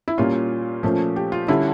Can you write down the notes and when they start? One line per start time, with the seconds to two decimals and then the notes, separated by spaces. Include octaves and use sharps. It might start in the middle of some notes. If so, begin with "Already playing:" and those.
0.08 E4
0.18 A#2 G3 A#3 C#4 F4
0.83 A#2 F3 A3 C#4
1.16 G4
1.32 F4
1.48 D3 G3 C#4 E4